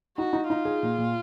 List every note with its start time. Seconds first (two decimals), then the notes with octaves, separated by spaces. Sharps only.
0.17 D#4 F#4
0.33 D#4
0.49 D#4 F4
0.65 G#4
0.83 A#2
0.98 A#2